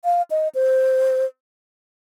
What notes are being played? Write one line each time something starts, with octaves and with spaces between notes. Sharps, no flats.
F5
D#5
C5